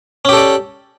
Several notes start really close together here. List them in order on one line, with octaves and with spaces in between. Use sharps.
C#4 G4 A4 D5